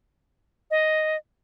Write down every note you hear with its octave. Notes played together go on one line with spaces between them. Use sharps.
D#5